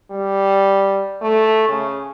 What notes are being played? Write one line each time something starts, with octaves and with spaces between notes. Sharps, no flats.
G3
A3
C#3